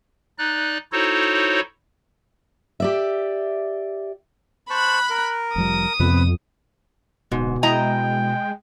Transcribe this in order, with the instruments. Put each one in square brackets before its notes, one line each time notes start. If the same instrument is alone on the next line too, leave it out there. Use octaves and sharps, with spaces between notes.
[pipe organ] D#4 D5 F#6
D#4 E4 F#4 A4 C5 C#5
[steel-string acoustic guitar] G4 D5 E5
[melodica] C5 A5 C#6 [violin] B5 F#6
[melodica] A#4
[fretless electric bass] F1 F3 G3 [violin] D#6
[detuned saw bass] F2 [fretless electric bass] C3 B3 [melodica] B4
[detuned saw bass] D1 [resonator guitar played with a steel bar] G#2 [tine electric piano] B2
[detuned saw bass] G#3 [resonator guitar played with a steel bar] E4 D#5 A#5 [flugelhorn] G5